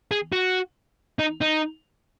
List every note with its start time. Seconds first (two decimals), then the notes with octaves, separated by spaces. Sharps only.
0.11 G#4
0.33 F#4
1.19 D#4
1.41 D#4